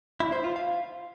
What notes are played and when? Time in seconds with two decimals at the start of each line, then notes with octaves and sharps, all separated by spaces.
0.20 E4
0.32 C5
0.44 F4
0.56 F5